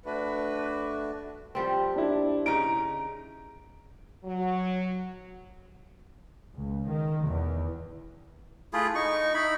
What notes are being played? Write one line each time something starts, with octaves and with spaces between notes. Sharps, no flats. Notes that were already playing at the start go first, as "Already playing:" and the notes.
A3 D4 F#4 B4
F3 G3 C4
D4 E4
C#3 D#4 A#5 D7
F#3
C#2
D#3
E2
A3 E4 F4 G#4
D#4 C#6
D#4 E4 B5